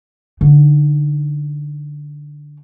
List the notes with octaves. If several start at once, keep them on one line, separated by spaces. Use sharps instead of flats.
D3 D#4